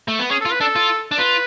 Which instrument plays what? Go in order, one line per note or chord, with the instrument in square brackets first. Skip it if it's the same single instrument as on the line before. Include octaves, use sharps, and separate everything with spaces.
[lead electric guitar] A3
B3
[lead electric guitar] C#4 [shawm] G#4
[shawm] A4
[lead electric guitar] F4
[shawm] B4
[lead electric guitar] D4 [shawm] A4
[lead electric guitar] F4
D4
[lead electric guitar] F4 [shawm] B4